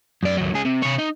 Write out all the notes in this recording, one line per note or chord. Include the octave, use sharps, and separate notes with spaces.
F#2 D5
D#2 F#3
C#2 G#4
C3
C3 C#5
D#4